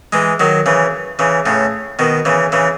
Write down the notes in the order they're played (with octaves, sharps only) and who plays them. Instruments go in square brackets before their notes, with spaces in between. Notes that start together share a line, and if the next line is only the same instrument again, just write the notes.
[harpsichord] E3 G#3
D#3 F#3
C#3 E3
C#3 E3
A2 C#3
B2 D#3
C#3 E3
C#3 E3